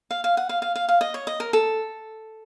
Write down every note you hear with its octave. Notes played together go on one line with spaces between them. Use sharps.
F5
F5
F#5
F5
F5
F5
F5
D#5
C#5
D#5
A#4
A4